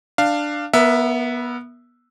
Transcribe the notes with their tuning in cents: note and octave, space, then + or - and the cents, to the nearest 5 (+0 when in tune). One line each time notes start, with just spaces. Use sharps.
D4 +10 F5 -5
B3 -20 A#4 +15 E5 +0